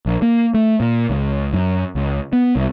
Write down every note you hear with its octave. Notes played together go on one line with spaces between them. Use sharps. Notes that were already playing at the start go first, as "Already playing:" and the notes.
A#1
A#3
A3
A#2
C#2
F#2
C#2
B3
C2